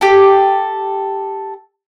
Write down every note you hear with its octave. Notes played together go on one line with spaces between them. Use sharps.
G4 A4